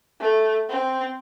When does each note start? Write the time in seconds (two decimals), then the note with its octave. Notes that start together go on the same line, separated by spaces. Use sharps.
0.20 A3
0.69 C4